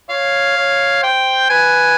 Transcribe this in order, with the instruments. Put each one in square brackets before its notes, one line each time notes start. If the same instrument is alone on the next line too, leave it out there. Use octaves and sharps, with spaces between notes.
[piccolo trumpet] C#5 [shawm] F5
[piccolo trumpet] C#5
[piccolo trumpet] C5 [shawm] G5
[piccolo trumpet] B4 [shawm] G#5